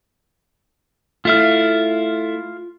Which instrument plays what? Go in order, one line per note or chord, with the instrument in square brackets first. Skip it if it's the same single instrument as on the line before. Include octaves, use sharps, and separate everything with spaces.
[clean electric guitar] A3 E4 [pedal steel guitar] F4 F5 F6